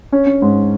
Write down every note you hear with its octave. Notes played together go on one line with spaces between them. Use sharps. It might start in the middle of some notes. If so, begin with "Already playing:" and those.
C#4
C#4
G#2